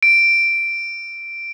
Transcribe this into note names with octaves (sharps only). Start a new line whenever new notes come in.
D7